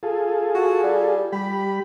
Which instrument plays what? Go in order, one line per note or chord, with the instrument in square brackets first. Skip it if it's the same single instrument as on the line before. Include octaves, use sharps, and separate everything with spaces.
[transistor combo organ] F4 G#4 A4
[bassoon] F#4
G3
[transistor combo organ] G3 B5 [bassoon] G4